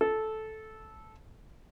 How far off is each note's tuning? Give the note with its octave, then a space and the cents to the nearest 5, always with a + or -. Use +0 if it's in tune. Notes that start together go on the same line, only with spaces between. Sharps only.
A4 -10